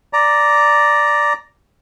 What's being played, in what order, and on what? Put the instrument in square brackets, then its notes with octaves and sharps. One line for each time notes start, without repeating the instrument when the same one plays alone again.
[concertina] D5 A#5